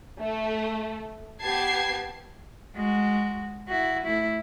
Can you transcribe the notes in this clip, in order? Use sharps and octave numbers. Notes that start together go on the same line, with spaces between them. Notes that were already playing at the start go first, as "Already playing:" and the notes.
A3
B3 G4 A5 G#6 C7
G#3 F#4
E4 F#4
A3 E4